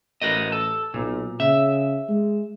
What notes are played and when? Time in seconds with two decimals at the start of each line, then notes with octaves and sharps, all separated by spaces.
0.22 A1 F#4 A#4 D#5
0.52 A4
0.94 B1 A#2
1.40 C#3 E5
2.09 G#3